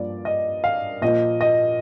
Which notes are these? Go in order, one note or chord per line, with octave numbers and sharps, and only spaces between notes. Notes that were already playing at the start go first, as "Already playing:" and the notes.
Already playing: G2 F3 A#3 D5
D#5
F5
A#2 F3 A#3 D#5
D#5